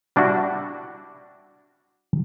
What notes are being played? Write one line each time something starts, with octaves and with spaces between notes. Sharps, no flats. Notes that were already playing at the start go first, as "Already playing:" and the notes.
G3 D4 E4 F#4